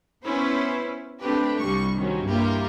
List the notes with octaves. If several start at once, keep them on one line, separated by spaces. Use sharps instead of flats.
B3 C#4 E4 B4 C5
A3 C4 D4 G4 B4
C2 G3 C#6
D#3 F#3 C4 C#4
G2 A#3 E4 F4 G4